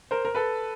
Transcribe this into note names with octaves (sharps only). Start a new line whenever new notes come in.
A#4 C5
A#4
A4 B4